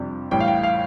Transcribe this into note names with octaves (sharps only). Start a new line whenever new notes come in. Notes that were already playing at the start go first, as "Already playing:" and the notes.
Already playing: F2 C3 G3 D4
A1 A2 G3 G5
F5
G5
F5